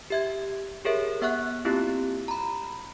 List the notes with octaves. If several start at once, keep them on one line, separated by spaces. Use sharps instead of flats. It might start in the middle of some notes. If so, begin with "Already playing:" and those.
G4 E5 G#6
G4 G#4 A#4 C#5 E5
B3 E5 F#5 C#6 F#6
A#3 C4 E4 F4 G4
A#5 B5